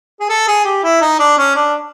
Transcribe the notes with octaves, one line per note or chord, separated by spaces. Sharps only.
G#4
A4
G#4
G4
E4
D#4
D4
C#4
D4